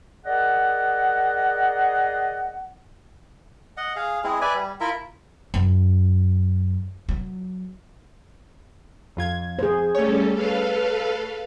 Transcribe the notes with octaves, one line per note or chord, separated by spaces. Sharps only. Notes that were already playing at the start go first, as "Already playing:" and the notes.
G#4 A#4 D5 D#5 F#5
D#5 F#5
G#4 F5
G#3 C4 E4 G#4
B4 D5 E5 G#5
G3
E4 F4 A#4 E5
F#2
F#3
F2 F4 G#6
G#4 C5
G3 A3 C#4 A4 C#5
A4 B4 F5